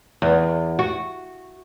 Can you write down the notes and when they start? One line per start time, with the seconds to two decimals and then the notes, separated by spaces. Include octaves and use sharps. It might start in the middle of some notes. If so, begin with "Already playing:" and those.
0.22 E2
0.79 F#4